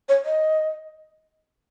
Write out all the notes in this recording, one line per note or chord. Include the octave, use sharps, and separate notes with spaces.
C#5
D#5